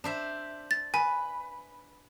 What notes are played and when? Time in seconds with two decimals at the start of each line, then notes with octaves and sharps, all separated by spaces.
0.04 D4 C5 E5
0.71 A6
0.94 B4 G#5